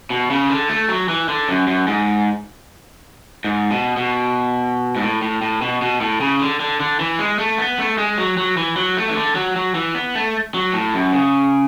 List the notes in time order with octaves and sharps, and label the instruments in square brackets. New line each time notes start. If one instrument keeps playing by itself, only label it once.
[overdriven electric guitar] B2
C#3
D3
A3
F#3
E3
D3
F#2
F#2
G#2
G#2
B2
B2
G#2
A2
A2
A2
B2
B2
A2
C#3
D3
D3
D3
E3
G#3
A3
B3
A3
G#3
F#3
F#3
E3
F#3
A3
E3
D3
F#3
F#3
E3
B3
A3
F#3
A2
F#2
C#3